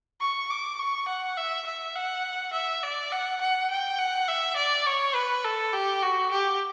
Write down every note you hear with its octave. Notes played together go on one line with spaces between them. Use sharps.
C#6
D6
C#6
F#5
E5
E5
F#5
E5
D5
F#5
F#5
G5
F#5
E5
D5
C#5
B4
A4
G4
F#4
G4